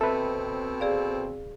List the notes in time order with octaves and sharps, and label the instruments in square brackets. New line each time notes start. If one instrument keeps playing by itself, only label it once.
[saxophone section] B2 C4 [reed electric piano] A4 B4 [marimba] E5
[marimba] G#4 D5 F5